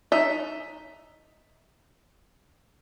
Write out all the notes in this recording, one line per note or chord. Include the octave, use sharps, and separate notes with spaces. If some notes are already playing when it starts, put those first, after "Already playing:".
D#4 E5